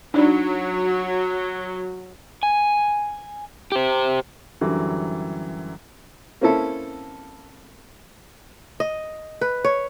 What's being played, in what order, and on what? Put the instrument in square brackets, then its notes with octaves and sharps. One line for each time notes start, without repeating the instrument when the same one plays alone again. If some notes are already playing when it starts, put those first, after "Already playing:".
[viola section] F#3 [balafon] D4 D#4 D5
[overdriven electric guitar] G#5
G4 C5
[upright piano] F#2 D3 E3 F#3 G3
[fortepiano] A#3 C4 C#4 E4 A4
[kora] D#5
B4
C#5